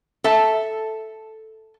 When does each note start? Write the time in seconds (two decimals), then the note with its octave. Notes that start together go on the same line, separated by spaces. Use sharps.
0.24 A4 E5 A5